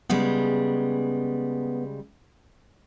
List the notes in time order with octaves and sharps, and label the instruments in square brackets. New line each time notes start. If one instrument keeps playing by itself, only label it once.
[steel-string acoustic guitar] C#3 G3 G#3 [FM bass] B3